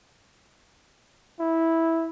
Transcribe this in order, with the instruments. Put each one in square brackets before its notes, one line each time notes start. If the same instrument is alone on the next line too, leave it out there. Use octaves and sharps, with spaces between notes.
[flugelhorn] E4